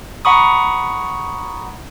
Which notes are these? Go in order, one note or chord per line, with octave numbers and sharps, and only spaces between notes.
F#5 A#5 B5 C#6 D#6